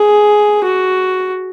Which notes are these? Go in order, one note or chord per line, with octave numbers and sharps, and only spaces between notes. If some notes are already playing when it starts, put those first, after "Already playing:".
Already playing: G#4
F#4